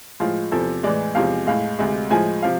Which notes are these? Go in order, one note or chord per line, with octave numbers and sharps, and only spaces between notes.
A2 F3 G#3 F4
E2 C3 F3 A4
A2 E3 G#3 D5
E2 C3 F3 G#3 F5
A2 G#3 F5
D2 C3 G#3
A2 F3 G#3 G#5
C3 F3 F5